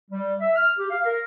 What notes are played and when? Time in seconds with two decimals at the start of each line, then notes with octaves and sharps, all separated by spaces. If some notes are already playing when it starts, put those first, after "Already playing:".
0.11 G3
0.40 E5
0.55 F6
0.78 G4
0.90 F5
1.05 A#4